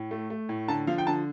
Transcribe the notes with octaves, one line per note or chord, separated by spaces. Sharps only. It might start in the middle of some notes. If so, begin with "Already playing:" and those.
Already playing: A2
A3
A3
A2
D3 A5
F3 F5
G5
D3 A5